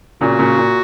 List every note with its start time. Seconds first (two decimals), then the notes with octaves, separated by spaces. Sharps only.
0.21 A#2 C#3 F#4
0.39 A#2 C#3
0.57 A#2